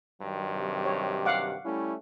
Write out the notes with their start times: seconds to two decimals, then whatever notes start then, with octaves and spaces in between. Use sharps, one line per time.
0.22 G2 D#3 F#3
0.53 C3
0.85 C#5
1.26 F5 F#5 D6
1.65 G3 A3 C#4 E4